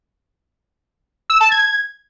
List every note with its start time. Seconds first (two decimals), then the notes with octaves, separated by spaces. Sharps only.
1.30 E6
1.41 A5
1.51 G#6